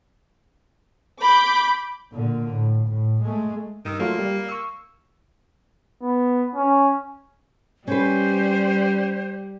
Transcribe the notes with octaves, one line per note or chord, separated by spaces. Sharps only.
B5 D6 G6
A#2 D3
A2
A2
G#3 A3
G2 D#3 E6
F#3 A3 A#3 F4
G3
C#6 E6
B3
C#4
G3 C#4 B4 C5